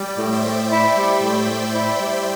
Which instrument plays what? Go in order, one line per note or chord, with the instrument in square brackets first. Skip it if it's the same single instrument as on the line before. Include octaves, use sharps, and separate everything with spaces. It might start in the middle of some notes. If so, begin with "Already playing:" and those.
Already playing: [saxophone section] G3 [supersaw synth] D5 G5
[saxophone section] A2
[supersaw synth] C5 E5
[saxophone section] A2
E4
G3
A2
A2
E4
G3